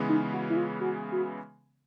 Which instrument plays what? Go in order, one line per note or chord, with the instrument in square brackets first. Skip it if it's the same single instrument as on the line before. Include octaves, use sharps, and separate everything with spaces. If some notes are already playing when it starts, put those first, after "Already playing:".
Already playing: [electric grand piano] C#3 E3 G#3 B3
[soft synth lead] D#4
F#4
E4
F4
F#4
F#4